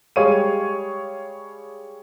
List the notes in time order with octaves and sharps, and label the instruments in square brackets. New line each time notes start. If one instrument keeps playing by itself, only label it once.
[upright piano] G3 G#3 G#4 C#5 F5 D#7